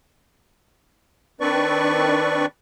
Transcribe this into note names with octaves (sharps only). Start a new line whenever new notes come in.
D#3 C4 D4 B4 D5 C#6